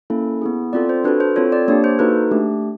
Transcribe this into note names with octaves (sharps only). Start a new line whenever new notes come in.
A#3 C#4 E4 A4
B3 E4 G#4
C4 F4 A4 D5
C5
D4 F#4 A4 B4
C5
C4 F4 A4 C#5
D5
A#3 D4 G4 C#5
C5
A#3 D#4 F#4 A4 B4
A3 D4 G4